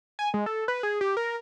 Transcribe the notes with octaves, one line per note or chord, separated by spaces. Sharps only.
G#5
G#3
A4
B4
G#4
G4
A#4